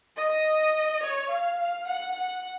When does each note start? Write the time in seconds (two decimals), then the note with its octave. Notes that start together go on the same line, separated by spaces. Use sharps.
0.16 D#5
1.03 C#5
1.30 F5
1.59 F5
1.87 F#5
2.15 F#5